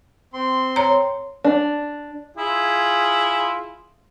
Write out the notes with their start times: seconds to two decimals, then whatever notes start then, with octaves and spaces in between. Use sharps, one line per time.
0.34 C4 C6
0.76 C#5 A#5
1.44 D4
2.37 E4 F4 G#4